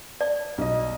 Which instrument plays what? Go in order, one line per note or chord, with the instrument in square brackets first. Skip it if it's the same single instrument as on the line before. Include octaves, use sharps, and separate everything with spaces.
[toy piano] D5
[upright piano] B1 D#5